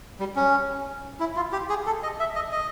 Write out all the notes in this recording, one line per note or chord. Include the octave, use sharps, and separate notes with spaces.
G3
C#4
E4
F4
G4
G#4
A4
D#5
E5
D#5
D#5